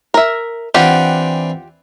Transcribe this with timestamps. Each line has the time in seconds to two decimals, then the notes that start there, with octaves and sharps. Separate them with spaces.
0.14 A#4 E5
0.74 E3 C4 D4 F4 G4 F#5